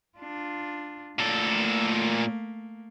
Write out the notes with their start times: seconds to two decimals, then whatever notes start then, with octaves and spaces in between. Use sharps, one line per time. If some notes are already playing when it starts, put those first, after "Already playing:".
0.18 D4 F4
1.19 A#2 A3 A#3 A4